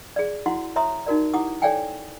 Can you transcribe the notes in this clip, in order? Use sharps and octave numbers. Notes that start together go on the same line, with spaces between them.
G#4 D5
E4 F#4 F#5 C6
C#5 E5 A#5 C6 D#6
D#4 F#4 A#4 D5
E4 G4 F#5 D6 D#6
A4 C#5 D5 F5 G5 G#5